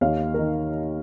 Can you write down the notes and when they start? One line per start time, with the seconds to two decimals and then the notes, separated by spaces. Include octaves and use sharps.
0.01 D#2 D#3 C#5 F5
0.34 D#3 A#4